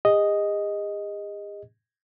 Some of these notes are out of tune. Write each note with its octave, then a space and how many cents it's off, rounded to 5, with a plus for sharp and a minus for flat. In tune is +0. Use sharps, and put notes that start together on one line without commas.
G#4 -45 D#5 +0